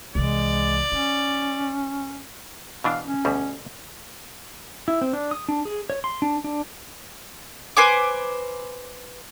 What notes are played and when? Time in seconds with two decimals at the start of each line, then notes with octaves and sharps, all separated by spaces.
0.15 C2 E3 G#3 D5
0.92 C#4 D#4
2.84 B2 E3 D4 F5
3.04 C#4
3.25 D2 B2 G3
4.88 E4
5.01 C4
5.13 D4
5.31 D#6
5.49 D4
5.65 G#4
5.90 C#5
6.04 C6
6.22 D4
6.44 D4
7.77 B4 C5 G#5 D6